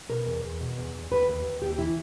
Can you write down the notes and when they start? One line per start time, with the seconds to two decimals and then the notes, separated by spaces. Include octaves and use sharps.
0.09 B2 A#4
0.26 E2
0.44 E2
0.60 B2
0.77 E2
0.94 E2
1.11 D#2 B4
1.28 D#2
1.44 D#2
1.62 D#2 G4
1.79 E3 E4